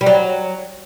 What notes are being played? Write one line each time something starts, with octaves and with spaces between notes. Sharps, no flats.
G3
F#3